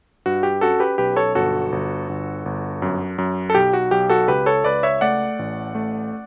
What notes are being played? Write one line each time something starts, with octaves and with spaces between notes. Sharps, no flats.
G2 F#4
G4
C#4 F#4 A4
G4 B4
B1 G4 B4
A4 C#5
G1 F#4 A4
G1
G1
G1
F#2
F#2
A4
B1 G4
F#4
B1 G4
F#4 A4
C#2 G4 B4
A4 C#5
C#2 B4 D5
C#5 E5
A3 D5 F#5
A1
A3